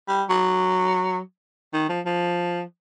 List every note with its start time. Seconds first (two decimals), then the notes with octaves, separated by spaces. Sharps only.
0.08 G3
0.30 F#3
1.73 D#3
1.89 F3
2.06 F3